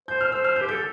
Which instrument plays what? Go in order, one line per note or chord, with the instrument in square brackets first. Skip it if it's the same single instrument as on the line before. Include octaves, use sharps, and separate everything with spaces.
[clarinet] C5 [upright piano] G6
[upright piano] F6
[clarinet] C5 [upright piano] E6
[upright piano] F6
G6
[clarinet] G4
[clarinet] A4 [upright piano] G6